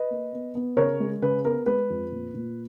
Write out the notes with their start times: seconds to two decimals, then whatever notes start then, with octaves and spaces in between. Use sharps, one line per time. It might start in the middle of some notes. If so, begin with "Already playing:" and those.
Already playing: B4 D#5
0.10 A#3
0.33 B3
0.55 B3
0.77 C#3 A#4 C#5
1.00 G#3
1.22 C#3 B4
1.44 B3 A#4
1.66 G#3 B4
1.90 F2
2.12 A#2
2.34 A#2